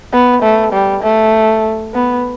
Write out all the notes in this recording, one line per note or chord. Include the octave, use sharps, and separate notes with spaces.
B3
A3
G3
A3
B3